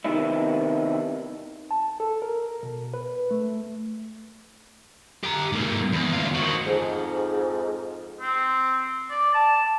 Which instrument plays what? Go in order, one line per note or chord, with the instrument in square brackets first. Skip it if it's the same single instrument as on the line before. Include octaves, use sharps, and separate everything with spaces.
[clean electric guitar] C3 D#3 B3 D#4 E4
[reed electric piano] A5
A4
A#4
B2
B4
A3
[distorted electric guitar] G4 A#5
G#2 A#3
E2
D2 F4
D#3 F#4
[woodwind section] F2 G#2
[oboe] C4
D5
A5